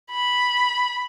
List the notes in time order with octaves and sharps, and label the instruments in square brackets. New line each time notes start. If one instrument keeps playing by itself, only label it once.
[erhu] B5